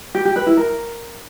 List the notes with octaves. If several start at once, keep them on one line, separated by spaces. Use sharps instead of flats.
G4
G4
B4
E4
A#4